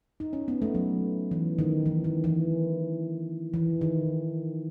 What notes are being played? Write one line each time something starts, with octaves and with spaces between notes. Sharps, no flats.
D#4
C#4
B3
A3
F#3
E3
D#3
E3
D#3
E3
E3
D#3